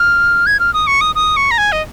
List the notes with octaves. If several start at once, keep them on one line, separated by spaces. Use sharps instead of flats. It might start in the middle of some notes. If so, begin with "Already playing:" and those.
Already playing: F6
G#6
F6
D#6
C#6
D#6
D#6
C#6
A#5
G#5
D#5